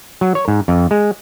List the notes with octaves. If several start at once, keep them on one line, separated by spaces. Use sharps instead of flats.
F#3
C#5
G#2
F2
G#3